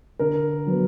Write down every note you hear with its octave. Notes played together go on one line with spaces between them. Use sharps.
D3 A#4
F#3 B3